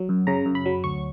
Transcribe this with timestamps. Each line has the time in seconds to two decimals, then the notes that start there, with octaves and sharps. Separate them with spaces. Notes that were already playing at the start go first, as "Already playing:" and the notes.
Already playing: F#3
0.09 F#2
0.27 C#3 A#5
0.46 F#2
0.55 B5
0.66 F#3
0.84 D2 C#6